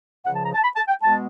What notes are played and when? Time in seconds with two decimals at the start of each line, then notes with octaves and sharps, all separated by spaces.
0.25 C#2 C#3 F3 F#5
0.34 A5
0.44 A#5
0.54 A5
0.63 B5
0.76 A5
0.88 G5
1.02 B2 G#3 B3 A5